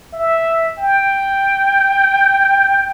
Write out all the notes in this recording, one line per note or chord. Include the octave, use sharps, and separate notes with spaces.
E5
G5